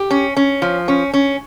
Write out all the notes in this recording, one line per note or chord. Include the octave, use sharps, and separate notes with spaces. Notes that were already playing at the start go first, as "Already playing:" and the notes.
Already playing: G4
C#4
C#4
F3
C#4
C#4